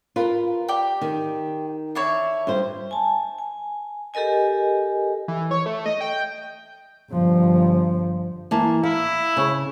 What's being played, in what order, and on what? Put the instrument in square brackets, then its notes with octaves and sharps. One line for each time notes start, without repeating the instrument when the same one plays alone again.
[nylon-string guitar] F4 A#4 B4
[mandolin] G4 D5
[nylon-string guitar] D#3
[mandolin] D4 E4 C#5
[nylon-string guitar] G2 C5
[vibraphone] G#5 A5
G#5
G4 A4 A#4 D#5 G#5
[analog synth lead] E3
C#5
A3
D#5
G5
[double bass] G1 F3
[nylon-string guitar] E3 A#3 A5
[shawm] E4 [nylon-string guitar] F5
[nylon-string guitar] C#3 C#5